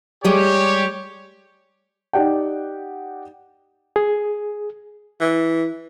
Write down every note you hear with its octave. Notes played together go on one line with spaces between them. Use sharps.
G3 G#3 G4 C#5
D#4 G4 D5 F#5 G5
G#4
E3